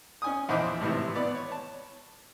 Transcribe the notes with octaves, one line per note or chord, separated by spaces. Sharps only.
C#4 G#5 D#6
A#1 E2 D#4 C5 E5 D6
G#1 A2 C3 E3
B3 D5
C#5
A5